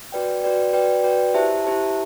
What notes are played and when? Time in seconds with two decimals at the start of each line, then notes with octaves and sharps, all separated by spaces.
0.12 F#4 B4 D5 G5
0.43 F#4 B4 D5 G5
0.73 F#4 B4 D5 G5
1.03 F#4 B4 D5 G5
1.34 E4 G4 C5 E5 A5
1.64 E4 G4 C5 E5 A5